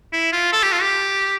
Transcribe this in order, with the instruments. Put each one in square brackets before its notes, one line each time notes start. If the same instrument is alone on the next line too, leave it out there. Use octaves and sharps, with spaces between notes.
[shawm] E4
F4
A4
G4
F4
G4